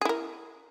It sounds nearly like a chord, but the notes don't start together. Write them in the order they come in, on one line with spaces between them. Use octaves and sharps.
G#4 E4 A#4